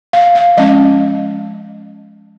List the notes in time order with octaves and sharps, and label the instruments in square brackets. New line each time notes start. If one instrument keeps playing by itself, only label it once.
[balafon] F5
F5
F3 G#3 C#4 D#5